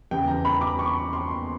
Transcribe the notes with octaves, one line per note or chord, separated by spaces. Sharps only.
E2 C#3 E3 G3 G5
A#5
B5
D6
C#6
C6